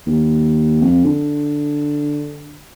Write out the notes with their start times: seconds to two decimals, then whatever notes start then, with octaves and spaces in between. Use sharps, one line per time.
0.06 D#2
0.81 F2
1.04 D3